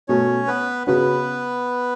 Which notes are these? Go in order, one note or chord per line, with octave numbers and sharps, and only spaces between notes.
B2 F#3 A3 C#4 C#5
B3 B4
C#3 F#3 B3 C#4 F#4 B4